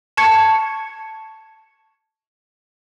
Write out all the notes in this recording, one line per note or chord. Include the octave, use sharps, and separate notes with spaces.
A5 C#6 G#6 C#7